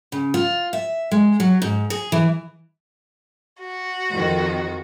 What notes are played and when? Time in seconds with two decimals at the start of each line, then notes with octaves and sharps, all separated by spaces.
0.12 C#3
0.34 F4
0.73 E5
1.12 G#3
1.40 F#3
1.62 G#2
1.90 G#4
2.12 E3
3.60 F#4
4.11 F2 D#3